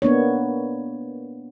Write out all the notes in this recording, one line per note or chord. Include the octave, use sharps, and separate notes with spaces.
A#3 B3 D4 C#5